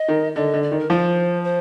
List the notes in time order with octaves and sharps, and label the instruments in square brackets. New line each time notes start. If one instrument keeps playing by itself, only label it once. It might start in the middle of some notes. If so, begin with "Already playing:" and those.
Already playing: [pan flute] D#5
[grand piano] D#3
[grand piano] D3 [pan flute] D#5
[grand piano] D3
[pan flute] D5
[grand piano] D#3
[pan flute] A#4
[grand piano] F3 [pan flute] C5
[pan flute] C5